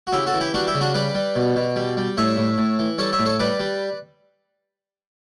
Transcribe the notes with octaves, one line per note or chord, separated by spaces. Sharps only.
F#4
C#3 E4 G4
F#4 A4
E3
E4 G4
G3 D4 F#4
E4 G4
C#3
D4 F#4
G3 B4 D5
G3
B2
B2
G3
G3
A2 C#5 E5
A2
A2
E3
G3 A4 C#5
C#5 E5
A2
A4 C#5
G3 B4 D5
G3